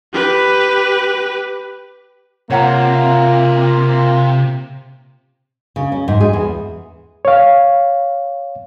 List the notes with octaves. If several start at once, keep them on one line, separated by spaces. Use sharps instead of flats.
G4 B4
C3 A#3 F4 C#5 F#5 A#5
C#3
C#4
G#2
G#4
E2
C#5 F5